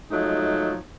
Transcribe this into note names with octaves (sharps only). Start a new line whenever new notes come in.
F3 F#3 G#3 A3 D#4